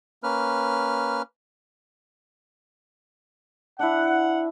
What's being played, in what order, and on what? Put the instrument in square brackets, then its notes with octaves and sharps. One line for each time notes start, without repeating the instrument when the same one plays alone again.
[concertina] A#3 C#4 B4 F6
[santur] D4 E4 [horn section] F#5